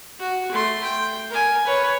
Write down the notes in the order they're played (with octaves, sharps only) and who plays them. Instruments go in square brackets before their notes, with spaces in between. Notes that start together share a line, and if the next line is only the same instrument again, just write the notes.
[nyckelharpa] F#4
A3 C6
G5
A#4 G#5
B4 C#5